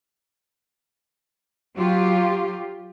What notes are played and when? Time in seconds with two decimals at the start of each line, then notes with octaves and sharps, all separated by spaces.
1.76 F#3 F4 G4